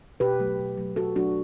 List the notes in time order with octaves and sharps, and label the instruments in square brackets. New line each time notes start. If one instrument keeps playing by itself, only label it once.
[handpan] B2 G4 B4
F#3 A3
B2
F#3 A3
B2 F#4 A4
F#3 A3 D4 F#4